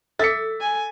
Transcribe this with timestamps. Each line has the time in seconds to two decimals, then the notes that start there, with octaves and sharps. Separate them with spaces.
0.19 A4 E5 D6 A6 B6 C#7
0.61 G#5